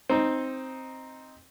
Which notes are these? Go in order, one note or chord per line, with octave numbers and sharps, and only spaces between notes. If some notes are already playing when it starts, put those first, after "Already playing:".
C4 D#4